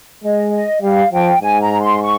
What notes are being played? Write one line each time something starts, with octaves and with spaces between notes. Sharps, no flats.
G#3 D#5
D#5
G3 F5
F3 G5
G#2 G#5
A#5
C6
C#6